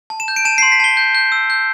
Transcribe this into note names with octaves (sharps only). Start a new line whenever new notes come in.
A5
E7
G6
D7
A5 E7
C6 C7
B6
A5 G7
G6
G6
E6
G6